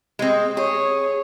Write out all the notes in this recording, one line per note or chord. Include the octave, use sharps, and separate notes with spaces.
G#3 C4
G#4 C#5